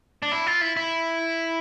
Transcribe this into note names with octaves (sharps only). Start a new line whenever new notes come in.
D4
E4
F4
E4
E4